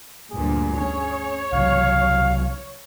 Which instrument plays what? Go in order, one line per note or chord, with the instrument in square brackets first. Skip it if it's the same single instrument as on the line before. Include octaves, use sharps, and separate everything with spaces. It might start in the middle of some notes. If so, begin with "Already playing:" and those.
[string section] D2 G2 A#2 [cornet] G#4
[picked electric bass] C#4 D4 [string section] C#5
[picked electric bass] C2 C#3 F#3 [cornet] F5